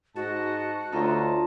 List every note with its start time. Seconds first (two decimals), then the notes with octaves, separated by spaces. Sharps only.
0.16 G#2 F#4 D#5 A5
0.92 D2 D#4 F4 C#5 D#5 A5